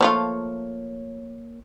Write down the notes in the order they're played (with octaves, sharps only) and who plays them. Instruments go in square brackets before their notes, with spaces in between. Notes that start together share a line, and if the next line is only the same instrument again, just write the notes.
[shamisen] F3 A3 F4 [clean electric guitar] A#3 C#5